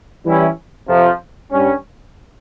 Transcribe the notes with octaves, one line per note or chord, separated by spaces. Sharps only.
E3 G3 C#4 E4 G4
F2 C3 F3
G2 G3 C#4